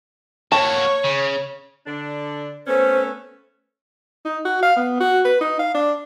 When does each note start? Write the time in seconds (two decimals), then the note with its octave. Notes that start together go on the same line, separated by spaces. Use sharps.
0.52 A#3 F#4 C#5 A5 C#6
1.04 C#3
1.86 D3 D4
2.67 A3 B3 C#4 C5
4.25 D#4
4.45 F#4
4.62 F5
4.76 B3
5.00 F#4
5.25 B4
5.41 D#4
5.59 F5
5.74 D4